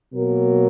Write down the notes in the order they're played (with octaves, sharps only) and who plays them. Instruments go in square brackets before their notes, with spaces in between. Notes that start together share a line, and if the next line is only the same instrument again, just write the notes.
[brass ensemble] B2 F#3 A#3 A#4